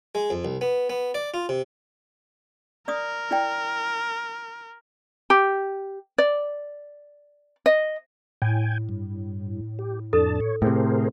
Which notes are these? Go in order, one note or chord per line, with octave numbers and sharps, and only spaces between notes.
G#3
F2
C2
B3
B3
D5
F4
C3
A#4 D5 D6 D#6
E4 D5 G5
G4
D5
D#5
A2 G5 G#5
G2
G4
F2 D4 A4 A5
C#5
A2 C3 G#4 A#4 C5